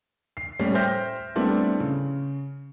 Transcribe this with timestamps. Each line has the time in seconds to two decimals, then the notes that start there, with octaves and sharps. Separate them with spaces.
0.37 C7
0.59 A2 G3 C#4
0.74 C5 E5 G5 F6 G6 A#6
1.36 G3 A3 B3 C4 D4 E4
1.80 C#3